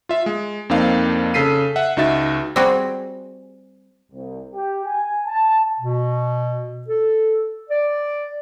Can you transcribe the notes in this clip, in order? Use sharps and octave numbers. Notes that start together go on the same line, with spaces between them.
F4 E5
G#3
F2 A#3 C4 D4 D#4 F5
C#3 A4 B6 C7 D#7
E5 F#5
C#2 D#4 F#4 E5 A6
G3 C4 F#4 G#4
C2
G4
G#5
A5
B2
A4
D5